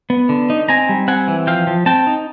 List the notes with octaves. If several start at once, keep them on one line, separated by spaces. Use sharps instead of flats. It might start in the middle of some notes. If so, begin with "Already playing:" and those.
B3
D3
D#4
C4 G#5 A#5
G3
C4 F#5 G#5
E3
F3 F5 G5
F3
C4 G5 A5
D#4